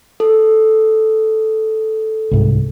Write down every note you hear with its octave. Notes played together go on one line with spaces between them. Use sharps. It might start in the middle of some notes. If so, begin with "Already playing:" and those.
A4
C2 G#2